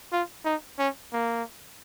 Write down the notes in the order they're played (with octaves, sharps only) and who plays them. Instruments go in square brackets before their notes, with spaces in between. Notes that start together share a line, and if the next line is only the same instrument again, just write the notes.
[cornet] F4
D#4
C#4
A#3